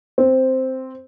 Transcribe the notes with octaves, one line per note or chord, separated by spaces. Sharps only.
C4